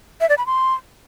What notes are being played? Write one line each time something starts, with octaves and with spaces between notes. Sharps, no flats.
E5
D5
B5
C6